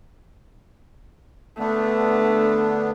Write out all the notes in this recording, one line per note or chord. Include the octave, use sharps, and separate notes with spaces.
D3 A3 B3 D4